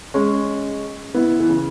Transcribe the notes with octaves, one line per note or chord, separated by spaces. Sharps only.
G#3 C#4
B3 E4
E3
C#3